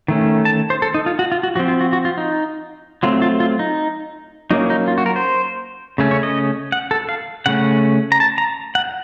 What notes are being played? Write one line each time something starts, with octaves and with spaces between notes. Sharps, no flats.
D#3 A3 C#4
A5
C5
A4
D#4
F4
F#4
F4
F#4
F3 C4 F#4
F4
F#4
F#4
F4
D#4
F#3 A3 C4 F4
F4
F4
D#4
F#3 A#3 C#4 D#4
D#4
F4
F#4
A#4
C5
C#3 A3 C#4
C#5
D#5
F#5
A4
F5
C#3 A3 C#4 F#5
A#5
A5
A#5
F#5